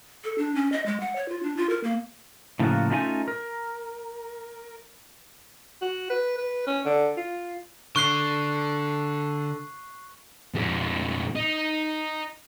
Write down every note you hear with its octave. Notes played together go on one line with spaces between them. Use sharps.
A4
D4
C#4
D#5
G#3
F#5
C#5
F4
D4
F4
A#4
A#3
A2 C#3 F3 A#3 F4 F#4
A3 C#4 D#4 F4 F5 G#5
A#4
F#4
B4
B4
C#4
D3
F4
D3 C#6 F#6 C7
F2 G#3
D#4